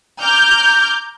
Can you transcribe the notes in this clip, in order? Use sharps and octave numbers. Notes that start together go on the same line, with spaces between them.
A#5 D6 F6 G6